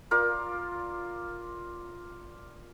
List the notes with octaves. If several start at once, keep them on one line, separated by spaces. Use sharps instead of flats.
F4 A#4 D5